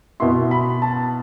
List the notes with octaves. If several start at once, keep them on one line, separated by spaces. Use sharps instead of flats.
B2 B3 E4 C6
B5
A5